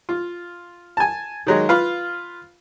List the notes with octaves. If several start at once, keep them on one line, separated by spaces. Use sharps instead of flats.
F4
G#5 A5
D#3 F#3 G#3
F4 B4 F5